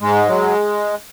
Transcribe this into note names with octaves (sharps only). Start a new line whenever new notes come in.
G#2 G#3
F#3